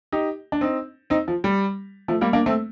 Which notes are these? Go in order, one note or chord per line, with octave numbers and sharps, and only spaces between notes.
D#4 G4
D4
C4 D#4
C4 D#4
F3
G3
F3 A3
G3 A#3
A#3 D4
A3 C4